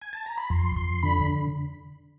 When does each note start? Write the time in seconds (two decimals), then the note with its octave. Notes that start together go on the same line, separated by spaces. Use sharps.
0.02 G#5
0.13 A5
0.26 A#5
0.38 B5
0.50 F2 C6
0.76 F2 C6
1.03 D3 B5